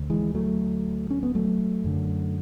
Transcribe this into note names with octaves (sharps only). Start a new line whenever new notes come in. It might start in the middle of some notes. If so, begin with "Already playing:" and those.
Already playing: D2
E3 G#3
F#3 A3
C#4
B3
F#3 A3
F#2 D3